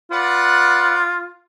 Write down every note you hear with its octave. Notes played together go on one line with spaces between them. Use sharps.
F4 B4 D5 F#5